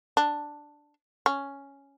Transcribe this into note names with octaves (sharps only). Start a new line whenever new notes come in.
D4
C#4